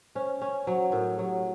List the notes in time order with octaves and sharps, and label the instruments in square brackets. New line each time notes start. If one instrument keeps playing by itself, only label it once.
[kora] C#4 [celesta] C5
[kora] C#4
[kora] F#3 [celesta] C5
[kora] A2 [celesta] A#4
[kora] F#3 [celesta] G4